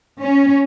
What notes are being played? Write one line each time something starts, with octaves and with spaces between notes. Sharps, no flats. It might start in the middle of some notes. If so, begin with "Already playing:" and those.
C#4